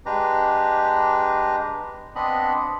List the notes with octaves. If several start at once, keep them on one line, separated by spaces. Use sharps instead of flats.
G#3 D4 G4 B4 A#5
B3 C4 D4 D#5 B5